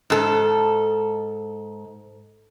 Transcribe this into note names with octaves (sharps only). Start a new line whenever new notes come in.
G#2 A4